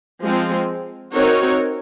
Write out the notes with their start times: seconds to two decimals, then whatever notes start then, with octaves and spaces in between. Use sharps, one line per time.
0.22 F3 G#3 C4
1.13 C4 D#4 F#4 A#4 C#5